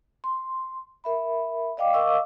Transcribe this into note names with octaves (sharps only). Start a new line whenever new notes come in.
C6
A#4 E5 B5
D5 D#5 F5 G5 D6
A#4 D#5 F5 C#6 D6 E6